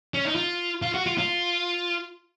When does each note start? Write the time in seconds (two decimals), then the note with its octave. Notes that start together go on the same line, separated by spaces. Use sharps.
0.14 C#4
0.25 D#4
0.35 F4
0.82 F4
0.94 F#4
1.06 F4
1.18 F4